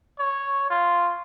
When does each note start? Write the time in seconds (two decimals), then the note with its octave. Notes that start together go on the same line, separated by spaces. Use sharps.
0.19 C#5
0.70 F4